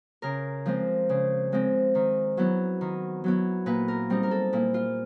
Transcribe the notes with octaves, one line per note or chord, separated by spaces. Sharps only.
C#3 A#4
F3 G#3 C4
C#3
F3 G#3 C4
D#3
F#3 B3 E4
D#3
F#3 B3 E4
A#2 B4
A#4
G3 C4 D#4
A#4
A4
A#2 E4
F4